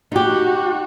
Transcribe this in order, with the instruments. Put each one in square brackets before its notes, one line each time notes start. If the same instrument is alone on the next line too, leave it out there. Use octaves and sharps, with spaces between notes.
[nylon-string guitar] D#4 G4 [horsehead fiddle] F#4